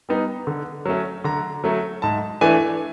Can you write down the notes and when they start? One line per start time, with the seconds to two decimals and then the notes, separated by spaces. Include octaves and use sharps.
0.09 G3 B3 D#4
0.47 D3
0.86 F#3 A3 C#4
1.24 D3 A#5
1.64 F#3 A3 C#4
2.02 G#2 A5
2.41 E3 A3 D4 G#5